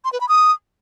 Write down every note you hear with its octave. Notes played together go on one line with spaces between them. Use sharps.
C6
B4
B5
D#6